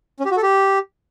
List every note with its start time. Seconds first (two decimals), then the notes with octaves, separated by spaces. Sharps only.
0.20 C#4
0.25 G4
0.31 F#4
0.37 A4
0.43 G4